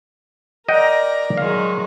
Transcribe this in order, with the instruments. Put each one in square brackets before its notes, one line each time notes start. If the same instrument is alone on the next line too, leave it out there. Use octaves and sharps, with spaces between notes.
[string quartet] A#4 D5 A#5 [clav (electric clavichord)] D#5 F#5 G5
[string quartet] D#3 F#3 G#3 [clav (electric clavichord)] F5